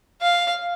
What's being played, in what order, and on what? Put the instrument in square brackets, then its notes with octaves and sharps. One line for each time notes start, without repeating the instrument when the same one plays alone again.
[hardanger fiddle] F5